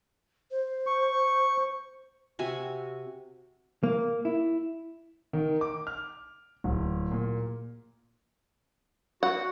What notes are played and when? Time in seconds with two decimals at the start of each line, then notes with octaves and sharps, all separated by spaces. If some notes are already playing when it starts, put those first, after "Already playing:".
0.51 C5
0.87 C#6
2.39 C3 F#4 E5 G#5
3.83 A#3
4.25 E4
5.33 D#3
5.61 D6
5.87 F6
6.64 D1
7.11 A#2
9.23 F#4 F#5